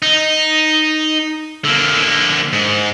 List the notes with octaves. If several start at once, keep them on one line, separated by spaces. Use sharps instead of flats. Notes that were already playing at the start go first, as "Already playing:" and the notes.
D#4
D3 A#3
G#2